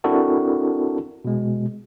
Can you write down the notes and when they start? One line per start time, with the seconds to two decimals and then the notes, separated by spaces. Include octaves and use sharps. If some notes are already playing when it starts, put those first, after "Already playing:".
0.04 C4 D4 E4 F#4 A4 A#4
1.25 B2 G#3